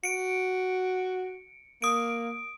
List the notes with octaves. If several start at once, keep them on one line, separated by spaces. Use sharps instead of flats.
F#4 C#7 D7
A#3 D#6 D7